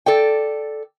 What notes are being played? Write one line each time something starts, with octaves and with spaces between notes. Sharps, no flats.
A4 D5 G5